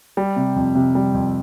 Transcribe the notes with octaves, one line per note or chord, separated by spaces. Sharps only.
G3
C3
F2
C3
G3
F2